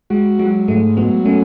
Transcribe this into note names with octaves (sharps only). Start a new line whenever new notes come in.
G#3 F#4
F#3 G#3
G#2 A3
F#3 B3
A3 C#4